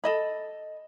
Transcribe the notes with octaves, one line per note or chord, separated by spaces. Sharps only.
A4 D#5 B5